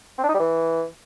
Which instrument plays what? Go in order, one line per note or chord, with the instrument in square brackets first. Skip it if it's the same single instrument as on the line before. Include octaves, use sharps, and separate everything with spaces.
[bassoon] C4
D4
D#4
G3
E3